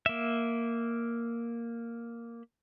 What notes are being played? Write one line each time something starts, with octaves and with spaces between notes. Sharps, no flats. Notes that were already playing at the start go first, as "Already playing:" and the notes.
A#3 E5